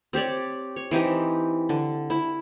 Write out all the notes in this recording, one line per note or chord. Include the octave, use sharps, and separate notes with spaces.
C4 G4 C#5 D5
C#5
E3 C4 D#4 G4
D3
E4